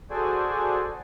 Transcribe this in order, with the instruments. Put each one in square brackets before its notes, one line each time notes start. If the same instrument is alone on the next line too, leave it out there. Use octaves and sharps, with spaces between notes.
[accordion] F#4 G#4 A4 C5 D5 G#5